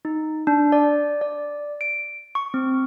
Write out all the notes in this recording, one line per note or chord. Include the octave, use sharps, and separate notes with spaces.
D#4
D4
D5
D5
D7
C#6
C4